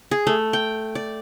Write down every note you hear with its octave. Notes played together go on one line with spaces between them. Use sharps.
G#4
A3
G5
D5